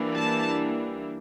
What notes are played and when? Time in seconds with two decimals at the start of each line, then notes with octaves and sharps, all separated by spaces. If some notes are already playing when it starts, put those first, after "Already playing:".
Already playing: E3 G3 A#3 D4
0.15 A5